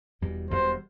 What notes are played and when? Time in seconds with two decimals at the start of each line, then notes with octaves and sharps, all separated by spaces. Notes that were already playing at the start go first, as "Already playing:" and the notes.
0.21 E1 E2 B2 G3
0.50 E1 E2 B2 G3 C5